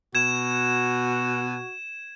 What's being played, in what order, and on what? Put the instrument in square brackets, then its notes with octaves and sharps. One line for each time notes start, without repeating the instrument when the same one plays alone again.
[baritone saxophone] B2 [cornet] F#4 [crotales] G#6 E7